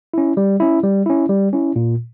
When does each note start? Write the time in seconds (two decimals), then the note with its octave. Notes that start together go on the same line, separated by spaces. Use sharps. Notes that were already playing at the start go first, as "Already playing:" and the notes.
0.14 C#4 E4
0.37 G3
0.60 C#4 E4
0.83 G3
1.06 C#4 E4
1.29 G3
1.53 C#4 E4
1.76 A#2